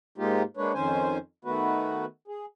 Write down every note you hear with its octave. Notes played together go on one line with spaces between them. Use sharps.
G#2 G#3 A#3 D#4 F4 G4
G#3 A#3 D4 B4 C#5
F2 D#3 C#4 C5 G#5
D#3 A3 B3 F#4 B4
G#4